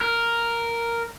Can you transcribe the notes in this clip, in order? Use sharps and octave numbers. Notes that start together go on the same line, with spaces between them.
A#4